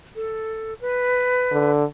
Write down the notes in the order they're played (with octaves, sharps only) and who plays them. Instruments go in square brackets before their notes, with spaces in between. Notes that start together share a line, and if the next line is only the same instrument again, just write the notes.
[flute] A4
B4
[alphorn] D3